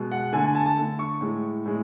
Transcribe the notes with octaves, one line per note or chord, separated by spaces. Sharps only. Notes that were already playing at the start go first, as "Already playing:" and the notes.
Already playing: B2 G#3
F#5
D3 A3 G#5
G#5
A5
A5
D3 A3
C#6
A2 G#3
A2 G#3